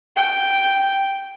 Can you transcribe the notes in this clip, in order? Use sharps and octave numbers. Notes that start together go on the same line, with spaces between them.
G5